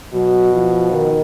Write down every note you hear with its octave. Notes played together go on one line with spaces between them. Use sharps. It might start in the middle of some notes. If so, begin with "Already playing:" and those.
B2 F#3
F3
D#3